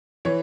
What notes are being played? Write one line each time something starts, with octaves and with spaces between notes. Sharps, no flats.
E3 C#5